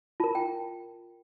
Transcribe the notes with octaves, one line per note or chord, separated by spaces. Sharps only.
F4 A#4 A5
G5